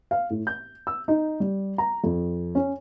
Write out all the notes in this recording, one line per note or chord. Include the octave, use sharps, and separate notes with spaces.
F5
A2
G6
E6
D#4
G3
A#5
F2
C#4